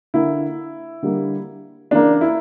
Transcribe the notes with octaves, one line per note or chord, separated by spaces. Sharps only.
D3 A#3 E4
D3 G3 A#3
C#3 E3 A#3 D4
E4